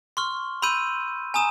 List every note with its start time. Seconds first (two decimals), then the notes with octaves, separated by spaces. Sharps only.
0.17 C6 C#6 F6
0.62 B5 C6 E6 G6 D#7
1.34 G#5 A#5 D#6 E7